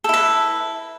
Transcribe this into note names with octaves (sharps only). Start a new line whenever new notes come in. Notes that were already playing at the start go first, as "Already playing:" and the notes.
E4 A4 B4